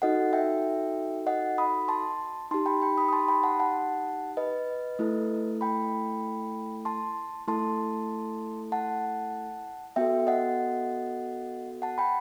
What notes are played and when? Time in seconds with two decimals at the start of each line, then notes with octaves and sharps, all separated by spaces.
0.02 D#4 F#4 A4 D#5 F#5
0.33 E5 G5
1.27 D#5 F#5
1.58 B5 D#6
1.88 A5 C6
2.51 D#4 G4 A5 C6
2.66 G5 B5
2.82 G5 B5
2.98 B5 D#6
3.08 D#6
3.13 A5 C6
3.28 G5 B5
3.43 F#5 A5
3.60 F#5 A5
4.37 B4 D#5
4.99 A3 E4 A4
5.61 G5 B5
6.85 A5 C6
7.47 A3 E4 A4 A5 C6
8.72 F#5 A5
9.96 B3 F#4 A4 E5 G5
10.27 D#5 F#5
11.82 F#5 A5
11.98 G5 B5